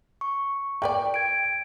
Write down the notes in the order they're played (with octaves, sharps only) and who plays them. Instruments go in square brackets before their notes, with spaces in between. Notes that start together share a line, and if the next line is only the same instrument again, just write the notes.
[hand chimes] C#6
[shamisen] A#4 B4 D5 [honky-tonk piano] G5
[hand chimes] G#6 D7